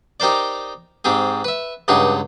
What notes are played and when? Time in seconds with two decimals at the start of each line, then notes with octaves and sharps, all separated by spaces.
0.20 D#4 G4 A#4 C5 D5
1.05 G#2 C4 G4 G#4
1.44 B4 E5
1.88 C#2 G2 D#4 G4 G#4 F#5